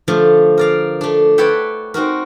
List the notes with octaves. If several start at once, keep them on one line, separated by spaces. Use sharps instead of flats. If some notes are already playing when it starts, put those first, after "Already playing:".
D3 F3 A3
A#4 D5 F5
A3 D4
B4 C#5 D5 E5 F#5 G5
C4 D#4 F#4 A#4